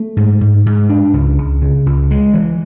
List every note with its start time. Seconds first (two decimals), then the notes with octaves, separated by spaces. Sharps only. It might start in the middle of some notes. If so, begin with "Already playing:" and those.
Already playing: A3
0.17 G#2
0.41 G#2
0.66 G#2
0.89 D4
1.13 C#2
1.38 C#2
1.62 C#3
1.86 C#2
2.11 G#3
2.34 E3